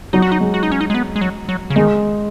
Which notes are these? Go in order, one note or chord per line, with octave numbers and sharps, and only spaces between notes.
F#3 D#4
F#4
D#4
G#3
F#4
D#4
C#4
D#4
G#3
B3
G#3
F#3
F#3
C#3
D#3 G#3